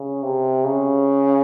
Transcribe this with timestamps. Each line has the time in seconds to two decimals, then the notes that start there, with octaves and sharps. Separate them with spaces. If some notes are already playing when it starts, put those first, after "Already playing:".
Already playing: C#3
0.23 C3
0.65 C#3